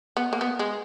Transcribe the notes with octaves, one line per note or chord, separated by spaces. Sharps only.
B3
A#3
B3
G#3